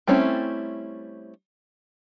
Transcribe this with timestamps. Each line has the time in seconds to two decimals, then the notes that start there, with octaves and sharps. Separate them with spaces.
0.07 G3 A3 C4 C#4 E4